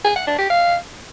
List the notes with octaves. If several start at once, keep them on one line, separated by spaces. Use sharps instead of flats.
G#4
F#5
D4
G4
F5